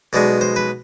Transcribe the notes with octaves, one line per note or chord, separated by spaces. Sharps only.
B1 B2 G#3 D5
C5
B4